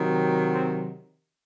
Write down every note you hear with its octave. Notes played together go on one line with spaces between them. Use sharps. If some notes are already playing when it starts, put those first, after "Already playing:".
Already playing: C3 D#3 F#3
C4